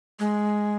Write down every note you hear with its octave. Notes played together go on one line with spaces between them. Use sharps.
G#3